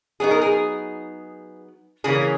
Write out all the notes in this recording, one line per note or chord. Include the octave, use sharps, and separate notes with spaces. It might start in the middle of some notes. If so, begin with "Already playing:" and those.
F#3 B3 D#4 G#4
A#4
G#4
C#3 E3 A#3 C#4 G#4